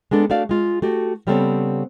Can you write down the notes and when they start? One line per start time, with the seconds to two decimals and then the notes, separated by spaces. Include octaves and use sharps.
0.11 G#3 B3 D4 A4
0.30 A3 D4 F#4 D5 F5
0.49 G#3 F4
0.82 A3 F#4 G4
1.27 C#3 G3 B3 C4 A4 C#5